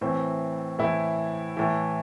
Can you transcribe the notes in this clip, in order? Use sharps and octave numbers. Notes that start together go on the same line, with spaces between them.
A2 E3 C4
A2 E3 E4
A2 E3